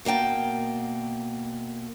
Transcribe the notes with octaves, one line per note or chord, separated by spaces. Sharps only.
B2 A#3 E5 G5 A5